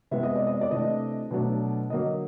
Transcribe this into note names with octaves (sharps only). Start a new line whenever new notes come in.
C3 E3 G#3 B3 E5
D#5
D5
D#5
D5
C3 E3 A3 D4 D#5
B2 F#3 A3 D4
D3 F#3 A#3 D#5